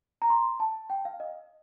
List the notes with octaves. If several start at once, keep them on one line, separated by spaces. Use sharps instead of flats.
A#5
C6
A5
G5
F5
D#5